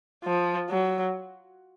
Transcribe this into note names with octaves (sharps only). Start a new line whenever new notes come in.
F3
F#3